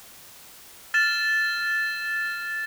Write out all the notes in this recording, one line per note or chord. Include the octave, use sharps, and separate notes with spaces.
F6 A6 E7